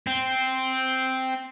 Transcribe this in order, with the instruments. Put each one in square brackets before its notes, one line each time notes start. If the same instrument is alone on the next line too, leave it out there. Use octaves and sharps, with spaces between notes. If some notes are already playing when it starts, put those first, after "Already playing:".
[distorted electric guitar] C4